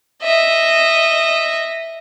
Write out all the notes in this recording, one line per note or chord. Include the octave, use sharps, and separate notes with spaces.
D#5 E5